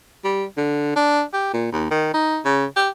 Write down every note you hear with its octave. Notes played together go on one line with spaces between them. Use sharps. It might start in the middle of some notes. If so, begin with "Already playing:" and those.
G3
D3
D4
G4
A#2
D#2
D#3
D#4
C#3
G4